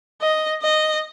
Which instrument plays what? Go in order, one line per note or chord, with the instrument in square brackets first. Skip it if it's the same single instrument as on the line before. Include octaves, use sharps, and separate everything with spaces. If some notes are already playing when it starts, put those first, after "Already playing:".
[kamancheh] D#5
D#5